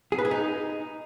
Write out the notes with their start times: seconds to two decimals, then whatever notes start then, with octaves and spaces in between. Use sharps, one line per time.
0.12 G#4
0.18 B4
0.25 G#4
0.31 D#4